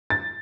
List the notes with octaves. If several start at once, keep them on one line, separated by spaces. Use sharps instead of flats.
A6